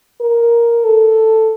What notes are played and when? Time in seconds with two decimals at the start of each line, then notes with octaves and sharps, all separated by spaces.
0.21 A#4
0.85 A4